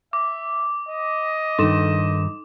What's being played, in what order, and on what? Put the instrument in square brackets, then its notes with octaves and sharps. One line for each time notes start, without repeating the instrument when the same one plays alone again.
[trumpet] E5 [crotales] D6
[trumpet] D#5
[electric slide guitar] G2 D#3 [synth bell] D#4 E7